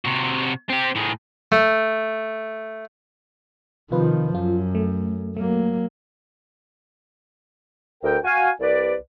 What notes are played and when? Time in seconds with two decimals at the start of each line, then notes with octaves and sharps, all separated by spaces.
0.05 C3 F#4
0.69 C4 G4
0.95 A2 G#4
1.52 A3
3.91 C3 D#3 F3 F4 B4
4.35 F#2 F4
4.75 A3
5.37 F#3 A3 A#3
8.03 D2 A#4 G5
8.24 F#4 F5 G#5
8.60 C2 B4 D5